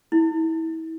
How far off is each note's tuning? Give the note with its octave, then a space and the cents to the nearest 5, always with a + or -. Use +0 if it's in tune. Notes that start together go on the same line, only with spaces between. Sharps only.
E4 -30